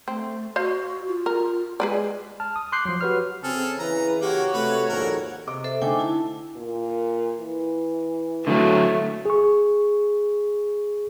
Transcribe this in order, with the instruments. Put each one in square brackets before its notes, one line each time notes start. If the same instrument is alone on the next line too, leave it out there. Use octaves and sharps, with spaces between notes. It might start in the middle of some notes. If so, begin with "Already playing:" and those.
[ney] A3 [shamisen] C4
[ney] F#4 [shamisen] C5 D#5 F5
[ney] F4
[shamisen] A#4
[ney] G#3 [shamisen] G#4 B4 D5
[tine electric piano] A5 F6
D#6
C6 D6 F#6 G6 C7
F3 F#3
F#4 G4 B4 C#5 F6
[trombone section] C#3 [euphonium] C4 [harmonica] G#4 A4 F6
[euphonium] E3 [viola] B4 [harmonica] A#5
[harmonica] A#3 [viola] F#4 C#5 [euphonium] G4
[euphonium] C3 [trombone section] A3 [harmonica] B4
[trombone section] A#1 G#2 A4 [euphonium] D#2 [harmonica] A#4
[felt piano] C3 D#5 D6
[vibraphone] A4 C5 E5
[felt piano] D3 A3 D#4 [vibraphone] G5 G#5 D6
[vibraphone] E4 A5
[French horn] A#2
E3
[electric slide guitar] D3 F#3 [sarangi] A3
[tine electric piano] G#4 C#6